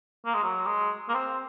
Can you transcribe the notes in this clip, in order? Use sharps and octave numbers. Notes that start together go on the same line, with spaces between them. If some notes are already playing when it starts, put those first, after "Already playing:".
A#3
G#3
F#3
G#3
A#3
C4